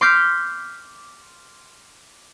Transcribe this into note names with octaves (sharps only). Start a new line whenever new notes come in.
C6 D6 F6 G6 B6